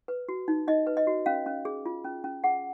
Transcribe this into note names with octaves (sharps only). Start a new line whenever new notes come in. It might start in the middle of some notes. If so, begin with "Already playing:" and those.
B4
F#4
D#4
D#4 D#5
B4
D#5
F#4
C#4 F5
C#4
G#4
F4
C#4
C#4
G#4 F#5